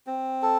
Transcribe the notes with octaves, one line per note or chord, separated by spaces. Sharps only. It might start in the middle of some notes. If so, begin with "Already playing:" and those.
C4
A4